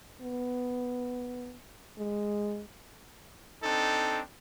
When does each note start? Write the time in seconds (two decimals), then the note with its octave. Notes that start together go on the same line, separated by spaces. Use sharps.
0.21 B3
1.98 G#3
3.63 C4 D4 D#4 A4